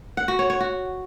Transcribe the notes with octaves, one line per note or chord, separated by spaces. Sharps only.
F#5
F#4
C#5
C#5
F#4